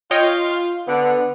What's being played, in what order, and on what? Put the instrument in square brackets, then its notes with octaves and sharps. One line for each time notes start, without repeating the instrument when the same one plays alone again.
[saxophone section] F4 [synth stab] C#5 D#5 G5
[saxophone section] D3 [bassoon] B3